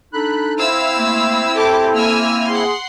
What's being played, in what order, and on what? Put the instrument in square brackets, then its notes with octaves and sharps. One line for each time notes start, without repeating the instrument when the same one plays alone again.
[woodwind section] D4 D#4 A4 [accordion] B5 F#6
[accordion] C4 E4 [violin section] F5 E6
[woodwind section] A3 A#3
[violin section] G4 A5 D6 [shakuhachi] A4 [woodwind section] G5
[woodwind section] A#3 [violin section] G#5 E6 F6
[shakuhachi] G#4 [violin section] F#5 C6